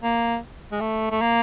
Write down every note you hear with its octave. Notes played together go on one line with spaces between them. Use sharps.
A#3
G#3
A3
A3
A#3